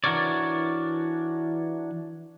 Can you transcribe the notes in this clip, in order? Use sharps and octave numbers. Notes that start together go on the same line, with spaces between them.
E3 D4 F#4 A#4 C#5 D5